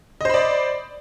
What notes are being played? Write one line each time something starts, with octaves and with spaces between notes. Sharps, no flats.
C5 D5 D#5 B5